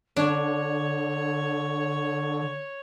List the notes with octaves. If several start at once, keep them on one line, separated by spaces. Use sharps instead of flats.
D3 D4 C#5